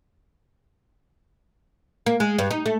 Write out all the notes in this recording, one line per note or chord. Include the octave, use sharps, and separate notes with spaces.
A#3
G#3
G2
D#4
A3